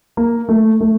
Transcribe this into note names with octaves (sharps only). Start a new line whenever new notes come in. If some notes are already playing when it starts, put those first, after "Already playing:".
A#3
A3
A3